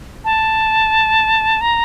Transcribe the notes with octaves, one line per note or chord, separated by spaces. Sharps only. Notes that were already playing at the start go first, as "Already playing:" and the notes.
A5
A#5